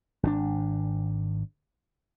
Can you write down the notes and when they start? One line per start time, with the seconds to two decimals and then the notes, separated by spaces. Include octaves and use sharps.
0.23 G#1 B2 D4